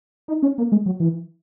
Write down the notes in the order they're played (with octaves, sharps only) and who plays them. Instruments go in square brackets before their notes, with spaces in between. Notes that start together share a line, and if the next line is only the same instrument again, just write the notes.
[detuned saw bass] D#4
C#4
A#3
G#3
F#3
E3